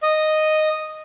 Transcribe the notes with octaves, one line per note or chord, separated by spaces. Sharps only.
D#5